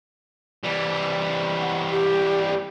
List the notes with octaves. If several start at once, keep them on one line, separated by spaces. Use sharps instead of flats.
E3 G3
F#5
G4